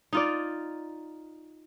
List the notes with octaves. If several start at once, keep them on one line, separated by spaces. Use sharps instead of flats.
D#4 F4 D5